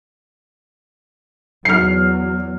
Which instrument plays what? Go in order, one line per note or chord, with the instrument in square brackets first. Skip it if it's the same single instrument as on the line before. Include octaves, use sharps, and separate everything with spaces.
[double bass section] E2 F#3 [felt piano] F6 C7